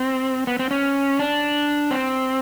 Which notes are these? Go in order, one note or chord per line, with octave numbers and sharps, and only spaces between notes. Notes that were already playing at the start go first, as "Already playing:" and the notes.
Already playing: C4
B3
C4
C#4
D4
C4